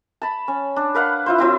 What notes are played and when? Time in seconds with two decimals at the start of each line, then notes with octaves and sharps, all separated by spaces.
0.22 A5 B5
0.48 C#4
0.76 D4
0.94 A#4 B4 F5 F#5
1.26 E4 F4 C5
1.38 F#3 C4 E4